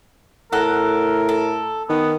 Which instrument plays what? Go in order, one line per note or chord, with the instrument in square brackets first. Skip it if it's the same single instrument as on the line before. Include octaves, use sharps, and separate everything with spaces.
[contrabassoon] A2 [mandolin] A4 F#5 [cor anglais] A#4
[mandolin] A4
[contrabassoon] D#3 [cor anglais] B3